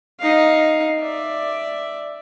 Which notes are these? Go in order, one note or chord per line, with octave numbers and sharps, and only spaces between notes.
D#4 F5
D5 E5